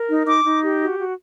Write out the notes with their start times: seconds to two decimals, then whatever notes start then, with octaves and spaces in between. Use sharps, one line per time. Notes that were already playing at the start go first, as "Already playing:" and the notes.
Already playing: A#4
0.09 D#4
0.27 D#4 D6
0.45 D#4
0.63 G4
0.80 F#4
0.98 F#4